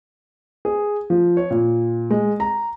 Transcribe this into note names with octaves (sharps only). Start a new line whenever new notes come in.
G#4
F3
C#5
A#2
G#3
A#5